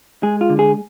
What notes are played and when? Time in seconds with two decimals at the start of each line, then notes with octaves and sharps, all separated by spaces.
0.23 G#3 G#4
0.41 F4
0.50 D3
0.59 G#4